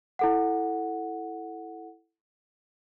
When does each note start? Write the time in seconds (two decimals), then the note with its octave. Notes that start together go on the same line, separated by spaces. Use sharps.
0.19 E4 A4 F#5